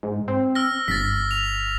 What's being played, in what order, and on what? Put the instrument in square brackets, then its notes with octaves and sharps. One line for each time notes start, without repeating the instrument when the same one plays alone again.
[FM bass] G#2
C4
[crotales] E6 F6 A#6
[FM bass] G1 [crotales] A6 B6
[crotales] F7